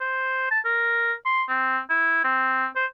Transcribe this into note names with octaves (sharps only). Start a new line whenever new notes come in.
C5
A5
A#4
C6
C4
E4
C4
C5